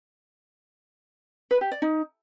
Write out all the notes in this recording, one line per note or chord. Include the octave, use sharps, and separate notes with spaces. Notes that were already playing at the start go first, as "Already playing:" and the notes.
B4
G4
D5
D#4